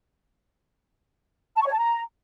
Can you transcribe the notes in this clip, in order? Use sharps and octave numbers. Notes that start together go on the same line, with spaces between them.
A5
C#6
C#5
A5
A#5